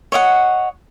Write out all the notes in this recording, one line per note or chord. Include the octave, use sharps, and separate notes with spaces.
C#5 D#5 E5 F#5